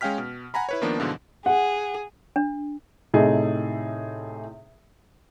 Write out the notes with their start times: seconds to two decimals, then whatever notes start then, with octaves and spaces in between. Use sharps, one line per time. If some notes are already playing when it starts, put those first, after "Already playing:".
0.01 G#3 C#4 F5 G5 F6 B6
0.18 B2
0.54 F#5 G#5 A#5 B5
0.69 E4 B4 C#5
0.82 D#3 F3 A#3 B3 D4
0.98 G#2 B2 D3 E3 F3
1.46 G#4 F#5
2.36 D4
3.14 A2 C3 D#4 G#4 A4